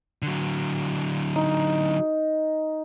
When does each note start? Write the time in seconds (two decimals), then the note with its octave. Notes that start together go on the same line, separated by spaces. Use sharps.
0.22 D3 F#3
1.36 D#4